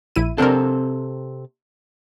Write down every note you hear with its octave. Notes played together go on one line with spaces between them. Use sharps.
A#1 E4 D#7
C3 C4 D4 A4 A#4